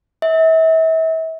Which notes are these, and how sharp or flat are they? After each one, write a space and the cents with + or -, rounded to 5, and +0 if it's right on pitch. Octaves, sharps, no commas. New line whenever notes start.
E5 -35